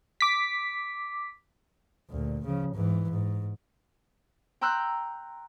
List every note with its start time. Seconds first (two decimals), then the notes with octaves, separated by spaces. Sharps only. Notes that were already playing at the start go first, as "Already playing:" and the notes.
0.21 D6 B6
2.11 D2 A#2
2.45 C#3 F3
2.75 G#2 E3
3.10 G#2
4.61 G5 A#5 C6 E6 F#6 G6